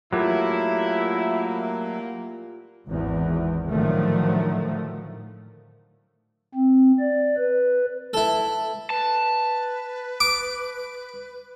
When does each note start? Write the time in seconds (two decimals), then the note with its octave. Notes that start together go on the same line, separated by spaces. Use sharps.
0.13 A#2 F#3 A3 A#3 E4 F4 G4 A#4
2.88 G#1 E2
3.69 A2 D3 D#3 F3 F#3 A3
6.54 C4
7.00 D5
7.37 B4
8.13 E4 A4
8.90 B4 A5
10.20 D6